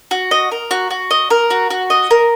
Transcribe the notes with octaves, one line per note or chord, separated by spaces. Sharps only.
F#4
D#5
A#4
F#4
F#4
D#5
A#4
F#4
F#4
D#5
A#4